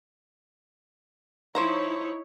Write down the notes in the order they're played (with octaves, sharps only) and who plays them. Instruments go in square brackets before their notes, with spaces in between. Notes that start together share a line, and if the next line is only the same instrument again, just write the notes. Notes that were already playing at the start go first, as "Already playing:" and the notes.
[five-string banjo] F3 C5 A#5 [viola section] D#4 E4 C#5